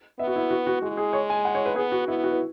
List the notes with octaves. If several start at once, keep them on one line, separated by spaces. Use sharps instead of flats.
B3 E5
F#4
E4
F#4
F#4
G#3 F#4
G#4
C#5
G#5
F#5
C#5
B4
B3 G#4
F#4
B3 E4
F#4
B4